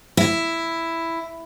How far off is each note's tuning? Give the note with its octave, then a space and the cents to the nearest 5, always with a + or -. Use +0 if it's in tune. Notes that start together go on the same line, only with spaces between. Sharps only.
E4 +5